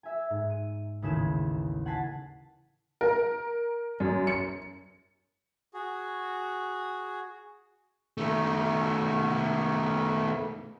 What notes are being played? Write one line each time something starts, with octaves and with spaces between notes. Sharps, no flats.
E5 G#5
G#2
D#7
A1 D#2 C#3 G#4 B6 E7
F#5 G#5 A5 B6 C7
A#4
F#2
C#7
F#4 G#4
D#3 A3